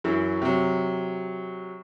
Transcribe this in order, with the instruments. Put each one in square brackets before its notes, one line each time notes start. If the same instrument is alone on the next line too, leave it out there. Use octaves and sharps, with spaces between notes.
[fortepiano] F#2 E3 F#3
C3 F#3